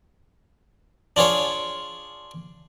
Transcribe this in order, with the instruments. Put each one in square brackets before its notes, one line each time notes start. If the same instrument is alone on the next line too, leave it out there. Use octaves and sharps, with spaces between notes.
[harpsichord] D4 F4 G#4 C#5